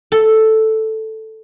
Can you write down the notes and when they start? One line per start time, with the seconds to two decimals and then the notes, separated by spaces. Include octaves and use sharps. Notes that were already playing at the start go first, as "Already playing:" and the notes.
0.12 A4